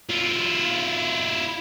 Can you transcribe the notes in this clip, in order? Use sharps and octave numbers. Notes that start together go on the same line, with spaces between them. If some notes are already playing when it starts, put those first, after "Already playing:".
E4 F4